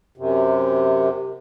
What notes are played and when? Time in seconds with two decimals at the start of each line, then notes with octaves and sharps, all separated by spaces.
0.17 F#2 C3